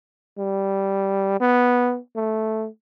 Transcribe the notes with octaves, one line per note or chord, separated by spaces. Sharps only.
G3
B3
A3